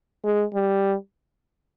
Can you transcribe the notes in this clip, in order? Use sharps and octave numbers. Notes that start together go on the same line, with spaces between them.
G#3
G3